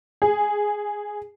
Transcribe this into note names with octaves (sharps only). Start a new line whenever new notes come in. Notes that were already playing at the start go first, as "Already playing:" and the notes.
G#4